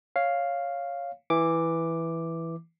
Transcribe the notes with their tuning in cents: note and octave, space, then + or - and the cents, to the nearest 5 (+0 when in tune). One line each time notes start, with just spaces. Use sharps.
C#5 +0 F5 +0
E3 +0 D6 +0